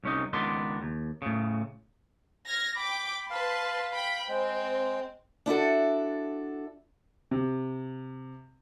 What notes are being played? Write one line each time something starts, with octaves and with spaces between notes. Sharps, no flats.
C2 C#4 D#4
C#2 D#3 B3 D4 C6
D#2
A2 C#3
F6 G#6 A#6
G5 B5 D6
B4 F5 A5 C6
G5 B5
G#3 C4 G5
D4 E4 F#4 A4
C3